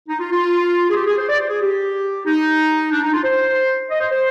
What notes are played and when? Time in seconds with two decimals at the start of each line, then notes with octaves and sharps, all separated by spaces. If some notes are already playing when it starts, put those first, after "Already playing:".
0.08 D#4
0.19 F4
0.31 F4
0.90 G#4
0.96 G4
1.06 G#4
1.17 C5
1.28 D5
1.39 C5
1.50 G#4
1.61 G4
2.26 D#4
2.91 D4
3.02 D#4
3.13 F4
3.23 C5
3.90 D#5
4.00 C5
4.11 C5